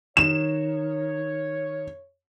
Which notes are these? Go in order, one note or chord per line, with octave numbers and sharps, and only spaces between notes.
D#3 C#5 E7